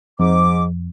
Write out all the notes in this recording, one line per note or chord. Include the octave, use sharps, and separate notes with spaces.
F2 G#2 D6